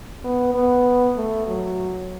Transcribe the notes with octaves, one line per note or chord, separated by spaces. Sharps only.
B3
B3
A3
F#3